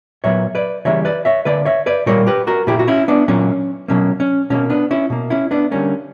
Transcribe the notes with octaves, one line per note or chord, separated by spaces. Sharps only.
A#2 F#3 B3 C#5 E5
B4 D5
C#3 E3 G3 A#3 C#5 E5
B4 D5
C#5 E5
D3 A#3 B4 D5
C#5 E5
B4 D5
A#2 G3 A#3 A#4 C#5
G4 B4
F#4 A#4
A#2 A#3 E4 G4
F#4
C#4 E4
B3 D4
A#2 F#3 A#3 C#4
B2 F#3 A#3 C#4
C#4
B2 G3 A#3 C#4
B3 D4
C#4 E4
B2 A#3
C#4 E4
B3 D4
D3 G3 A#3 C#4